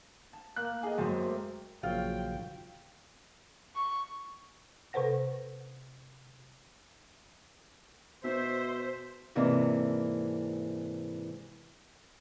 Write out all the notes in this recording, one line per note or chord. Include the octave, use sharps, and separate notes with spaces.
A5
A#3 F#6
G4 G#4 D#5
F#2 G#3 C5
A3 E5
A#1 C#3 F#3 F4 G5
C#6
C3 A4 B4 C5 F#5 A#6
B2 C5 E5
G#2 C3 E3 A#3 D4